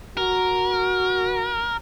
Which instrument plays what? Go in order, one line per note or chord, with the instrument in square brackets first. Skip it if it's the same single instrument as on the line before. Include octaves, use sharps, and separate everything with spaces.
[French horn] F#4 [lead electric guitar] A#4